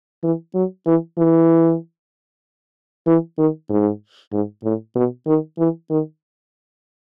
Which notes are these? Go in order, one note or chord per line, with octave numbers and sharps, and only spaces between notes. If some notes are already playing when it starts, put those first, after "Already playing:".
E3
F#3
E3
E3
E3
D#3
G#2
G#2
A2
B2
D#3
E3
D#3